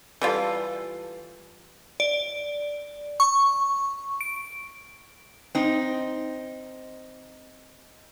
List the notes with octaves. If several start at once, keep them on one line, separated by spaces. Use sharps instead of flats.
E3 G3 F4 A4
D5
C#6
D7
C4 D#4